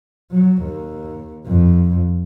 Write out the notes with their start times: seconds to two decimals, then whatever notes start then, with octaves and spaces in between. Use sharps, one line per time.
0.31 F#3
0.62 D#2
1.46 F2